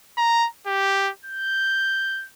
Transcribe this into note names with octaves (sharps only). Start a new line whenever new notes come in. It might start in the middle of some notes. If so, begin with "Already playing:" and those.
A#5
G4
G6